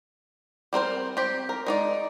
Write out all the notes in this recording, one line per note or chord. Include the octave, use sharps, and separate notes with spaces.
G3 C4 A#4 C5
C4 G4
A#4
G#3 D#4 D5